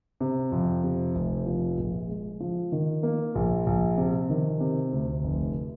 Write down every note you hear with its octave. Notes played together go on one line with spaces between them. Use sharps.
C3
F2
C3
F1
F3
A#1
G#3
F3
D#3
A#3
A#1
A#1
C3
D#3
C3
D2
F1